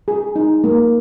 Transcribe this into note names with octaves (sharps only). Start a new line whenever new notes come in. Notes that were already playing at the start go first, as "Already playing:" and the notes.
G#4
D#4
A#3